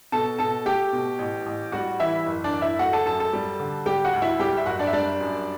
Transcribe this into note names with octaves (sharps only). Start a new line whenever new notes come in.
B2 A4 A5
B2 A4 A5
A3 G4 G5
B2
A1
A1
G3 F#4 F#5
E3 E4 E5
F#1
D4 D5
F#1
E4 E5
A3 F#4 F#5
A4 A5
F#2 A4 A5
A4 A5
G3
D3
G3 G4 G5
F#4 F#5
D2
E4 E5
G3 G4 G5
E5
F#1 F#4 F#5
D4 D5
E5
G3 D4 D5
F#2